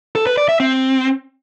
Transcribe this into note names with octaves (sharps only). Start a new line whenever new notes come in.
A4
B4
D5
E5
C4